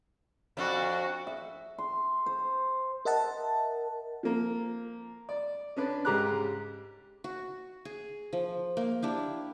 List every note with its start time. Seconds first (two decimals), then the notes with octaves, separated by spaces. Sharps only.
0.57 F2 D4 F#4
1.27 E5
1.78 C6
2.26 C5
3.05 A#4 D#5 E5 F#5 A5
4.23 F3 A#3
5.29 D5
5.76 C#4 D4 B4 D5
6.05 G#2 C#3 G4 A#5 D6 F#6
7.24 F#4
7.85 G#4
8.33 F3
8.77 A#3
9.03 D4 E4 G4